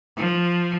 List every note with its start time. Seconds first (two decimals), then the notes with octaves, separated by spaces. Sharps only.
0.17 F3